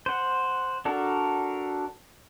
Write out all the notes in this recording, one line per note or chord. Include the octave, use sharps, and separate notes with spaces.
C5 F#5
D4 F#4 A4 A#4